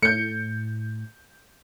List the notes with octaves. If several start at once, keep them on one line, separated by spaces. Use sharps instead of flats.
A2 G6 C#7